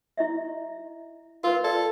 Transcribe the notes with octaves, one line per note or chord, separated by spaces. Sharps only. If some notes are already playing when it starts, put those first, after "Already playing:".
E4 D#5 E5
F4 A#4 B4
A4 D5